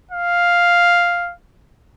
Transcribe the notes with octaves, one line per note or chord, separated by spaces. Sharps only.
F5